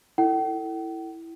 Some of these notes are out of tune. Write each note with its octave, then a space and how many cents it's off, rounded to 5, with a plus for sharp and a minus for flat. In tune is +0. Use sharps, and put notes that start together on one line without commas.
E4 +0 A4 +25 G5 -45